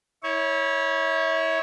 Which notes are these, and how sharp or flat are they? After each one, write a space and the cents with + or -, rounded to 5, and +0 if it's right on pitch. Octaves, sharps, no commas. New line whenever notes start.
E4 -30 C#5 +0